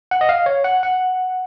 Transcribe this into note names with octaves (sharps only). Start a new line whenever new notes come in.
F#5
D#5
F5
C#5
F#5
F#5